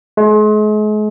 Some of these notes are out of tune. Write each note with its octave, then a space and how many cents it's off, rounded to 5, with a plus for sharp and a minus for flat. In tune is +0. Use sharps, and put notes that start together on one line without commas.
G#3 +40